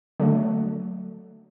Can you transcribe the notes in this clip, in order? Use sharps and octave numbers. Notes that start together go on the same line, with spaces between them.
D3 F#3 A3